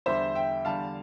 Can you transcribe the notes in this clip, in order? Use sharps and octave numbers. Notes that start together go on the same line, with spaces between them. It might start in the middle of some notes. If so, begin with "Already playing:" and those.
E2 D3 G3 C5 E5
E5 G5
E2 D3 G3 F5 A5